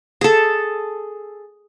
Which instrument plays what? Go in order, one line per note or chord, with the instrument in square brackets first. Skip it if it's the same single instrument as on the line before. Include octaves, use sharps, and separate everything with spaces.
[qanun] G#4 A4